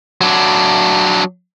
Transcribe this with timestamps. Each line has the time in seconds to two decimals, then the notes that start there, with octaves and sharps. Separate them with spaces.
0.21 F#3 D4